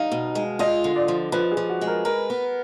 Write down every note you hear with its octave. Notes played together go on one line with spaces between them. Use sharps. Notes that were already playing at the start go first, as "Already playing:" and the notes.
Already playing: D#4 F5
B2
G#3
F4 D#5
D3
D5
F3
F3 B4
G#4
F3
F#4
G#3
A#4
A#4 B4
B3